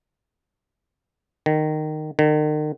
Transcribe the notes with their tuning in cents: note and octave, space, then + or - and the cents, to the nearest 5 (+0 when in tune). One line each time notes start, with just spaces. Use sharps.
D#3 -15
D#3 -40